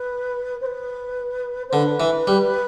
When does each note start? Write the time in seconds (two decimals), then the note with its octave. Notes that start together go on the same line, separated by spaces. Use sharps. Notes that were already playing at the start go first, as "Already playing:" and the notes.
Already playing: B4
0.61 C5
0.66 B4
1.69 C5
1.73 D3 B4
2.00 E3
2.27 G3